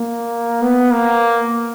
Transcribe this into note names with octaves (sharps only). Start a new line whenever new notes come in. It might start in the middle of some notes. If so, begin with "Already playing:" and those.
Already playing: A#3
B3
A#3